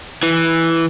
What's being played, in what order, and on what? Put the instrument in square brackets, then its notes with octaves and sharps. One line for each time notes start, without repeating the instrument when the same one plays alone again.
[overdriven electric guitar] E3